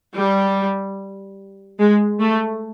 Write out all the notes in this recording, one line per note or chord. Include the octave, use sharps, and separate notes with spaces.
G3
G#3
A3